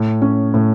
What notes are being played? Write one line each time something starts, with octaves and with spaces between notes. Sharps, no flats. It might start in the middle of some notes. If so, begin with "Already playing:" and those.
Already playing: A2
C#4
A2